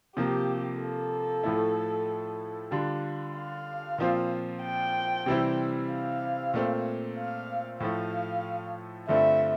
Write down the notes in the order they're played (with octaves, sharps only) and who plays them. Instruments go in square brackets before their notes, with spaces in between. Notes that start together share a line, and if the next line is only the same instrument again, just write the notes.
[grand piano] C3 F3 A#3 [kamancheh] G4
[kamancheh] A4
[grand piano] A2 F3 A3 E4
D3 G3 D4 F4
[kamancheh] F5
[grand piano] A#2 F3 C4 F4
[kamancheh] G5
[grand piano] C3 E3 G3 C4 E4
[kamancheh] F5
[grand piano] A#2 A3 C4
[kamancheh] F5
[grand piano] A2 F3 A3 [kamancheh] F5
[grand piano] G2 D3 A3 C4 F4 [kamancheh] E5